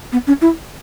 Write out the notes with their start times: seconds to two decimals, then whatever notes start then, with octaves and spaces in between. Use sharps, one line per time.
0.12 B3
0.27 C#4
0.42 E4